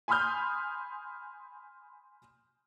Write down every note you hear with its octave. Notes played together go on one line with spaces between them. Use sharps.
G#5 B5 C6 D#6 F6 G6